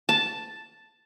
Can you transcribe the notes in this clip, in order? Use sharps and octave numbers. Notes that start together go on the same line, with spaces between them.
A5